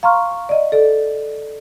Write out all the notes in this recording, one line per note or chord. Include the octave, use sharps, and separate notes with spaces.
F5 A#5 C6 C#6 F6
D5 D#5
A4 D5